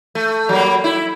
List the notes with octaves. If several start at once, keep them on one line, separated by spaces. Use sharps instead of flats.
A3
F#3 G3 A#3
E4